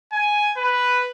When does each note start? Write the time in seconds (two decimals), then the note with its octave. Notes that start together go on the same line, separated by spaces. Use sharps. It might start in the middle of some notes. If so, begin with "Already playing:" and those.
0.13 G#5
0.57 B4